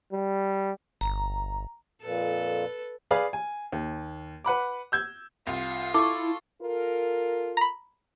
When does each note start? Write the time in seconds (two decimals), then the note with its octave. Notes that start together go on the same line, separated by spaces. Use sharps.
0.13 G3
1.01 G1 A#5
2.02 F2 A#2 A4 B4
3.11 G#4 B4 D5 F5 B5
3.33 G#5
3.72 D#2
4.44 B4 F#5 B5 D6
4.92 E6 G6 G#6
5.47 C2 F4
5.94 E4 A4 C#6 D6
6.61 F4 A4 A#4
7.57 A#5 B5